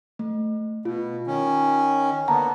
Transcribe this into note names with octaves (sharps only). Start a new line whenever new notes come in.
A3
B2 F4
D#3 C#4
D3 A#3 B3 F#5 A5 A#5